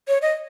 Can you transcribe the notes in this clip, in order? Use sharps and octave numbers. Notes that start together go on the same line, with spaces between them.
C#5
D#5